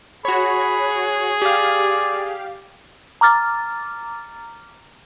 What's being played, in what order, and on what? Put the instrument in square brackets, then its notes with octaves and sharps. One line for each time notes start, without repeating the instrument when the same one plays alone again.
[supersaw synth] F#4 C#5 [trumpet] G#4 [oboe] B5
[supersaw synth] G4 F5 [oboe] D5
[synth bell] A#5 D6 F6 A6